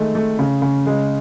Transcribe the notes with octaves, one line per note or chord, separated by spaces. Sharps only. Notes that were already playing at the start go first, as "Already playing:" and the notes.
Already playing: D#3 G#3 A3
A3
C#3
C#3
G#3